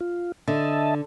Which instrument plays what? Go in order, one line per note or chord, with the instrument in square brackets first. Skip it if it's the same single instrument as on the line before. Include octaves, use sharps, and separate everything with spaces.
[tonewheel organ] F4
[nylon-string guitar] D3 [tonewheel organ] D#5 E5 A5